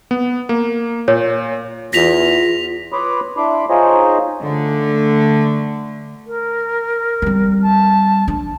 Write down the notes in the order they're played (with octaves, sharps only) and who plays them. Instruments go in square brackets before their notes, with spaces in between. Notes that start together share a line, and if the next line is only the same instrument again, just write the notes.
[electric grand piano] B3
A#3
[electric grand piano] A#2 [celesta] C#5
[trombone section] E2 [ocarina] F4 [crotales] A#6 B6 F7
[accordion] B4 C#5 B5 C6 D6 D#6
D4 E4 B5 C6 D6
D#4 F4 G#4 C5 C#5 D#5
[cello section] D3 A3
[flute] A#4
[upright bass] G3 C4
[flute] A5
[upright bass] D4